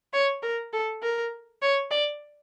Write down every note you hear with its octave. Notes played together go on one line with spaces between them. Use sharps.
C#5
A#4
A4
A#4
C#5
D5